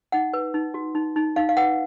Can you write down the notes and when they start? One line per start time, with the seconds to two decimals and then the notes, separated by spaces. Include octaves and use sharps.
0.12 D#4 F#5
0.33 B4
0.54 D#4
0.74 F#4
0.95 D#4
1.16 D#4
1.36 D#4 F5
1.49 F5
1.57 B4 F#5